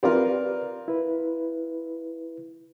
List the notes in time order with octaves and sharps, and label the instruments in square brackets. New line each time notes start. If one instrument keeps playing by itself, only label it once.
[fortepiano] C4 F4 A#4 [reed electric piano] G4 B4 D5
[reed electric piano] E4 B4